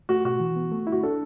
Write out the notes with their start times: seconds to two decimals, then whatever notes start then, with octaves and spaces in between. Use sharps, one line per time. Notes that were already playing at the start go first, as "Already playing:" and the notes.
0.09 A3 F#4
0.25 B2 F#4
0.40 E3
0.56 B3
0.72 A3
0.87 E4
0.92 F#4
1.03 D4 A4